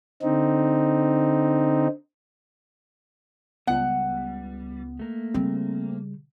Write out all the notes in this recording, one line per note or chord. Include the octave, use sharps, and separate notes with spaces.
D3 C4 D#4
C#2 G3 B3 F#5
A3 A#3
C#3 G3 C4